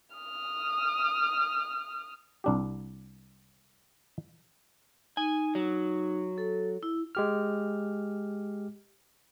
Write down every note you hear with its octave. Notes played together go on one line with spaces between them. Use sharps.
D#6 F6
C2 D4 G4
D#4 G#5
F#3
A4
E4
G#3 G4 F6